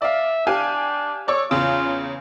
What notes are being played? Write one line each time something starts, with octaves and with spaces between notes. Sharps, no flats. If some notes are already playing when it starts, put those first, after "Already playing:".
D5 E5 F5
D4 G4 F5 G#5
C#5 D5 C#6 E6
E2 C#3 F4